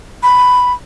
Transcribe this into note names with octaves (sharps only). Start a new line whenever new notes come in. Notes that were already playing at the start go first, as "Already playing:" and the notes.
B5